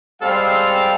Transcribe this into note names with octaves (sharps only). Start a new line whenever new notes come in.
G3 G#3 C4 A4 F5